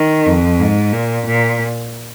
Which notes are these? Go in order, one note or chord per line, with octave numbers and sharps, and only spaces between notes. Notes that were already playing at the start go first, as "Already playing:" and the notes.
Already playing: D#3
F2
G#2
A#2
A#2